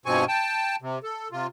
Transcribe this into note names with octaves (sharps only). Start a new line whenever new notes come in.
G2 B2 F3 C4 G#5 C#6
G5 A5
C3
A4
C3 F4